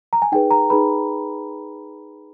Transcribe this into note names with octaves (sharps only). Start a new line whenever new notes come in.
A#5
G#5
D#4 G#4 B4 G5
A#5
D#4 G#4 B4 B5